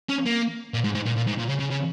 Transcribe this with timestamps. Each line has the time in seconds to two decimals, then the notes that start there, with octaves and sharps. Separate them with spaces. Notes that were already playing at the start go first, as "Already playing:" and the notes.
0.09 C#4
0.26 A#3
0.74 A#2
0.84 G#2
0.95 G#2
1.06 A#2
1.17 A#2
1.27 G#2
1.39 A#2
1.49 C#3
1.60 C#3
1.71 C#3